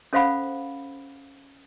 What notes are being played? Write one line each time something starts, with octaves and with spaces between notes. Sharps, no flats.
C#4 A4 C5 F5 F#5 B5